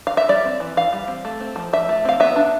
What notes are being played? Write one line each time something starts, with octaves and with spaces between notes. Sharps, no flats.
F5
E5
G3 D5
C4
E3
E3 F5
G3
C4
A3
C4
F3
F3 E5
A3
C4 F5
B3 E5
D4